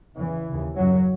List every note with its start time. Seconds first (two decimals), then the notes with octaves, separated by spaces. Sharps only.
0.17 E2 C#3 E3
0.47 D#2 C#3
0.77 F#2 C#3 F#3